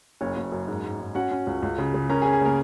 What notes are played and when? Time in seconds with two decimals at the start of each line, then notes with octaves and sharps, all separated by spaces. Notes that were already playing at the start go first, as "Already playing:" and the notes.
0.21 F#1 C#4 C#5
0.37 F#1
0.52 F#2
0.68 G#2
0.84 G#2
0.99 G#2
1.15 C#4 F#4 F#5
1.31 C#4
1.47 C#2
1.62 C#2
1.78 C#3
1.94 C#3
2.09 C#4 A#4 A#5
2.22 G#4
2.26 C#4
2.33 G#4
2.41 C#3 A#3 A#4